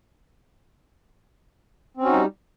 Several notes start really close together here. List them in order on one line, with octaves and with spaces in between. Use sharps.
C4 C#4 F#4 D#4 G3